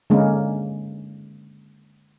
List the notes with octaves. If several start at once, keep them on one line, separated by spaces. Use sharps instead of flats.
D3 G#3 A#3 C#4